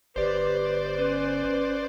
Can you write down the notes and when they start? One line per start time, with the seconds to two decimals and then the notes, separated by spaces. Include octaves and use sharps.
0.16 G1 G4 B4 C5 D5
0.97 C#4 B4